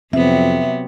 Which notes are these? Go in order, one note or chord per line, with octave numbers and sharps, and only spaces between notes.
F2 C3 F#3 B3 C4 E5